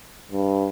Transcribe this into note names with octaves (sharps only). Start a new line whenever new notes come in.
G2